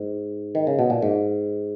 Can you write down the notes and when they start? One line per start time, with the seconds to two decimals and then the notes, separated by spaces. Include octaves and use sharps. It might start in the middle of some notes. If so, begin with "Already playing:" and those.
Already playing: G#2
0.55 D#3
0.67 C#3
0.79 B2
0.90 A#2
1.02 G#2